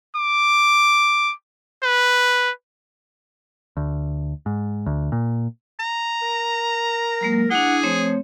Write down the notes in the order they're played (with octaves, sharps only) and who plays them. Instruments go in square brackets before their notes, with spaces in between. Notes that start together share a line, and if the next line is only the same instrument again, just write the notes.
[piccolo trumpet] D6
B4
[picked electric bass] D2
G#2
D2
A#2
[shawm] A#5
[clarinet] A#4
[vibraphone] F#3 G#3 A#3
[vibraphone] D4 E4 [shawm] G#4 [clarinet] F#5
[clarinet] F3 [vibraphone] A3 C4 C#5